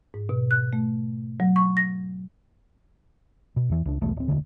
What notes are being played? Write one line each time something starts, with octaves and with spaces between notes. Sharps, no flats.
G#2
B2
F#6
A3
F#3
C#6
A#6
B2
E2 E3
C#2 D4
B1 E2 G#2 A3
D1 C4
E1 D2 D3